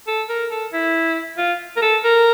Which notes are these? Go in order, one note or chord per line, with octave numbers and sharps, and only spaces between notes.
A4
A#4
A4
E4
F4
A#4
A4
A#4